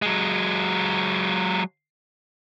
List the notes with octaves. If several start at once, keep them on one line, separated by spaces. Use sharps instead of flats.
F#3 G#3